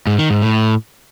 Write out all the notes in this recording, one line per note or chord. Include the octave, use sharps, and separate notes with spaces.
G#2
D#3
G#2
A2